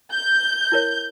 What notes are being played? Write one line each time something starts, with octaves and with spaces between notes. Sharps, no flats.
G6
E4 A#4 C#5